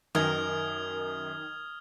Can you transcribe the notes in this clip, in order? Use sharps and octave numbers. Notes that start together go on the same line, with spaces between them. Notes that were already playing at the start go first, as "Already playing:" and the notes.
F#2 D#3 A#4 D#6 F6 G#6